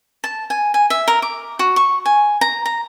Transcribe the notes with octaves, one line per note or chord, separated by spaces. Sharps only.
A5
G#5
G#5
E5
A#4
D6
F#4
C#6
G#5
A#5
A#5